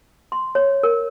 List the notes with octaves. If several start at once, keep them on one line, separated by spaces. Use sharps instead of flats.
C6
C#5
A#4